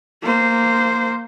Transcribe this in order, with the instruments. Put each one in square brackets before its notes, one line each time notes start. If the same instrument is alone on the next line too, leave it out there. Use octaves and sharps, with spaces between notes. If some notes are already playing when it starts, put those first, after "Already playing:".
[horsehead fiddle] A#3 C5